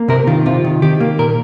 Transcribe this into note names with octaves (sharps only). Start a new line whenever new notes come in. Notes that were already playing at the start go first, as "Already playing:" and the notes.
Already playing: A#3
C3 A#4
D#3 F4
C3 F4
D#3
D#3 G4
A#3
A#2 A#4